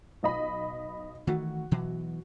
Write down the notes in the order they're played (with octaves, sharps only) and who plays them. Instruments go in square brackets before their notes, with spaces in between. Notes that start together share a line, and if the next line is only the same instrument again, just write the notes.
[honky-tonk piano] B1 D#5 B5
[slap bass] D#3 E3 A3 [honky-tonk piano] F#4
[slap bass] B2 E3 F#3